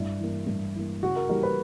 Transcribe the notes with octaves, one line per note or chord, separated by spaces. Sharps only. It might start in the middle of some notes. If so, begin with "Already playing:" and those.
Already playing: G2 E4
E3 A#3
G2
E3 A#3
C#3 F#4
A#4
E3 G3 A#3 A#4
B4